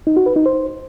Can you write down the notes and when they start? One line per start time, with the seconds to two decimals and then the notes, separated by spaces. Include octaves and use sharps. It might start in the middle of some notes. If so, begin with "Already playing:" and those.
0.07 D#4
0.17 F#4
0.26 B4
0.36 D#4
0.46 C5